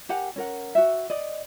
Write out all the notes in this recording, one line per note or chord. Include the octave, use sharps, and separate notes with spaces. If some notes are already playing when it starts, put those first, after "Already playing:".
G4 A#4 F#5 G#5
C#4 A#4 F#5
F#4 E5
D5 D#5